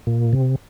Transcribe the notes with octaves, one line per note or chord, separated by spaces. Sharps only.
A#2
C3